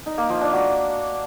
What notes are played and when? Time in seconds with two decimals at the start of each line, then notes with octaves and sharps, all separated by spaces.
0.06 D#4
0.18 A#3
0.30 F3
0.41 D4
0.53 F#4